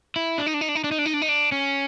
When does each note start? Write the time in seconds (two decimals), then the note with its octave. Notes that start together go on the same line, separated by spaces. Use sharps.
0.16 E4
0.38 D4
0.46 D#4
0.54 D4
0.61 D#4
0.69 D4
0.75 D#4
0.84 D4
0.91 D#4
0.99 D4
1.06 D#4
1.14 D4
1.22 D#4
1.29 D4
1.52 C#4